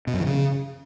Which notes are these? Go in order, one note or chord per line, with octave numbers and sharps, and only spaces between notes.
B2
F#2
E3
C#3